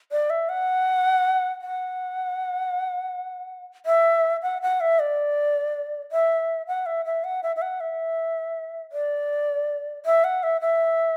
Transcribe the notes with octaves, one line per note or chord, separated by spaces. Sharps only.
D5
E5
F#5
F#5
E5
F#5
F#5
E5
D5
E5
F#5
E5
E5
F#5
E5
E5
F#5
E5
D5
E5
F#5
E5
E5